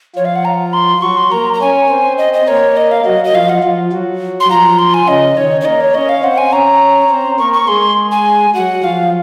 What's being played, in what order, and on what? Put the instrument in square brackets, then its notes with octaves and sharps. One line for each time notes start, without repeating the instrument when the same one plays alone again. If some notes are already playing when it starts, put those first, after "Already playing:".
[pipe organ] F3 F4 [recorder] C#5
[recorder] F5
F#5
A#5
C6
[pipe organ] F#3 F#4 [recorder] C#6
[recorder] C6
[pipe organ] A#3 A#4 [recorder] A#5
[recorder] A#5
[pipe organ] C#4 C#5 [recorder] G#5
[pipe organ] C4 C5
[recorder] D#5
D#5
[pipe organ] A#3 A#4 [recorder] C#5
[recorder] D#5
F5
[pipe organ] F#3 F#4 [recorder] D#5
[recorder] D#5
[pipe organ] F3 F4 [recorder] F5
[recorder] F#5
[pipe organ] F3 F4
F#3 F#4
[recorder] C6
[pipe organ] F3 F4 [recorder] A#5
[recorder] C6
G#5
[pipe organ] C#3 C#4 [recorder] D#5
[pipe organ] D#3 D#4 [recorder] C#5
[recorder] C#5
[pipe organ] A#3 A#4 [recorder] D#5
[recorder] C#5
[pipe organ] C#4 C#5 [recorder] D#5
[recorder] F5
[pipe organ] C4 C5 [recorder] F#5
[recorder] G#5
[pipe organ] C#4 C#5 [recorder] A#5
[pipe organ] C4 C5
[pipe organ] A#3 A#4 [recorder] C#6
[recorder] C#6
[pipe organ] G#3 G#4 [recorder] C6
[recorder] G#5
[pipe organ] F#3 F#4 [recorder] F#5
[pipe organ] F3 F4 [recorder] F5